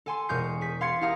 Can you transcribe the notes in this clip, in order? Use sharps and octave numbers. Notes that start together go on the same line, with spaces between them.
A4 G#5 C6
E1 A#4 C#6 D#6 G6 C7
G#4 B6
F5 C6 G#6 A6 C7 C#7
E4 G4 A#4 F5 A#5 D#6